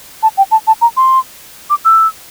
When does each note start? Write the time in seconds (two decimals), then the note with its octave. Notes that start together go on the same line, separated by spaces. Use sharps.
0.23 A5
0.37 G5
0.51 A5
0.67 A5
0.81 A#5
0.97 C6
1.70 D6
1.85 E6